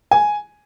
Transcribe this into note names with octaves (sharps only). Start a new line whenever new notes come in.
G#5